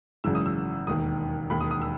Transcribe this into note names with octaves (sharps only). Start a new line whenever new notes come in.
G#1 F#2 C#3 E3 E6
D#6
E6
E1 D#2 D#3 D#6
E1 D#2 D#3 B5
D#6
D#6
E6